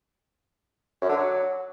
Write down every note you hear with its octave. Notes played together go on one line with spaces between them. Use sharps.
F#2
D3
F#3